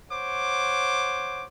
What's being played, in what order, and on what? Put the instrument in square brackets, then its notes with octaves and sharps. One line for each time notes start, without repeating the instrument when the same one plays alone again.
[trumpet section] C5 C#5 F#5 D6